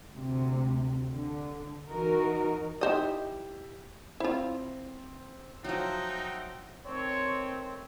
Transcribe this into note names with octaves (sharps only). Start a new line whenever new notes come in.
D2 C3
D3
E3 D#4 F#4 A#4
D#4 E4 G4 C5 D#5
C4 E4 F4
F3 F#3 D#4 E5 F#5 G5
D#3 A3 C4 C#5